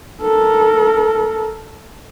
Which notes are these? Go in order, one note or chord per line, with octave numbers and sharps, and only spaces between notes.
A4 A#4